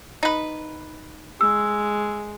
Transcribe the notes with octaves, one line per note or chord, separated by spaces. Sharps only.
D#4 B4
G#3 E6